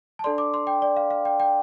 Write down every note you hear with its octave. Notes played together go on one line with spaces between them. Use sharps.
A5
D4 A4 D5 C6
D6
C6
G5
D5
F5
F5
G5
G5